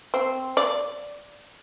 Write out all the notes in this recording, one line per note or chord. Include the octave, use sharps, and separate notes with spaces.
C4
D5